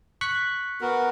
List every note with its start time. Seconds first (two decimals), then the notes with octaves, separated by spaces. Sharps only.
0.21 C#6 F#6 B6
0.81 B3 F#4 A#4